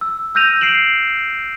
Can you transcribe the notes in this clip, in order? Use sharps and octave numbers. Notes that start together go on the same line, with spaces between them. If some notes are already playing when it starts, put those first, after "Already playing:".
E6
E6 F6 G6 A#6 D#7 F7
C7 D7 E7 F#7